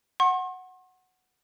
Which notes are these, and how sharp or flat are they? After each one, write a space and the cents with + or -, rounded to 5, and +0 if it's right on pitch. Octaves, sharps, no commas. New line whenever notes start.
F#5 +0 C6 +45